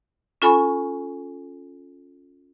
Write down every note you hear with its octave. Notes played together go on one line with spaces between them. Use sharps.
C#4 F4 A4 G#5 B5 C#6